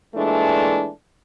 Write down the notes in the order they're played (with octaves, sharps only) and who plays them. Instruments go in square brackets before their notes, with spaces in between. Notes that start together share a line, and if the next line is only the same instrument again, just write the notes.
[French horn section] A#2 E3 G#3 A3 D4